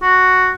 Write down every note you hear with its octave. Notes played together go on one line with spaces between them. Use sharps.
F#4